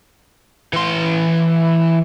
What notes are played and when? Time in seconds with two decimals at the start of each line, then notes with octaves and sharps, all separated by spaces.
0.73 E3 C6